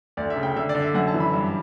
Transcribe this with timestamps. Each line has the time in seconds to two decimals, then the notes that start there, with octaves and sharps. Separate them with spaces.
0.17 D2 D5
0.30 E5
0.36 C#3
0.43 G5
0.56 D3 E5
0.69 D5
0.75 D3
0.82 E5
0.95 F#2 F#5
1.07 A5
1.14 E3
1.20 B5
1.34 G2